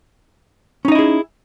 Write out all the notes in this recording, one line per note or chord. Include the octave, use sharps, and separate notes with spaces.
C#4 D#4 E4 G#4 D#5